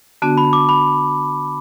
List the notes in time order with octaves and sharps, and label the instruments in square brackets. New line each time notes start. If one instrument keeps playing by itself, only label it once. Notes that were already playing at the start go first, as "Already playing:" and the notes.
[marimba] D3 B3 D4 F#4 [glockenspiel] A5
[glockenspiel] B5
D6
B5